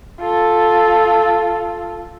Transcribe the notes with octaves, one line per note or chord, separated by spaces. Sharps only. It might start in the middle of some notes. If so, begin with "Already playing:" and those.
F4 A4